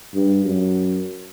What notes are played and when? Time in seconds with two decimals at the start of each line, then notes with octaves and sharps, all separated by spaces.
0.14 G2
0.45 F#2